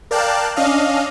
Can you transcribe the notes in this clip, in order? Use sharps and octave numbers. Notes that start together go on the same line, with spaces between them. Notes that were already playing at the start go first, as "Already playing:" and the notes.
A#4 D5 F5 G5 A5 F#6
C#4 D4 D#5 F5